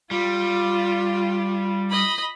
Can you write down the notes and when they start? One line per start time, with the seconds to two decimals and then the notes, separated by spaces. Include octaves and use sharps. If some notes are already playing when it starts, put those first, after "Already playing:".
0.11 G3 F4
1.90 D#5 B5